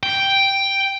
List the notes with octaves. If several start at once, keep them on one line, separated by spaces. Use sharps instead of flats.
G5